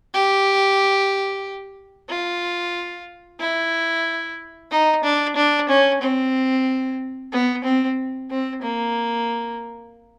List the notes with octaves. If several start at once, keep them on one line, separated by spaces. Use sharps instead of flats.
G4
F4
E4
D#4
D4
D4
C#4
C4
B3
C4
C4
A#3